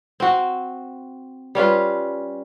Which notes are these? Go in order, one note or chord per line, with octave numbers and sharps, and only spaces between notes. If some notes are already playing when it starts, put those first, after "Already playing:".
C4 F#4
G3 C#4 F4 B4